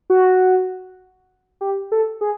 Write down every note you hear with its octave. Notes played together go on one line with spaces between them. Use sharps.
F#4
G4
A4
G#4